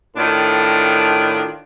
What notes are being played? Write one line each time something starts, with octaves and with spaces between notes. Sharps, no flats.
A2 D#3 D4 F4